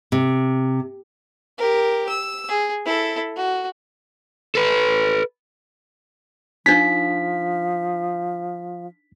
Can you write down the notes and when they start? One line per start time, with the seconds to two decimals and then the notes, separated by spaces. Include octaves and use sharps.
0.12 C3
1.58 G4 A#4
2.09 E6
2.48 G#4
2.85 E4 A4
3.36 F#4
4.55 A4 B4
6.66 F3 D4 D#4 B6